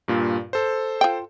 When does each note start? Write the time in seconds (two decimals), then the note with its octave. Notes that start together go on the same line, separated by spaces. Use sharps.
0.08 G2 A#2 F4
0.53 A4 C5
1.01 F4 G5